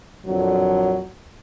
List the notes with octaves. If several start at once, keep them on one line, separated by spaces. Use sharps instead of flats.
F2 A#2 D3 F#3